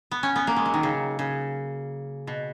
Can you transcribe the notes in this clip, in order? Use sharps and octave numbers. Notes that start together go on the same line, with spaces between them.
B3
C#4
B3
A#3
G#3
F#3
D#3
C#3
C#3
B2